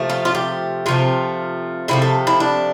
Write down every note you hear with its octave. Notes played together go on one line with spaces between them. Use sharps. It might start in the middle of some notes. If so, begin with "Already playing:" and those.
Already playing: C3 F3 A3
F4
F4
G4
C3 F3 A3 F4
C3 F3 A3 E4
A4
E4
D4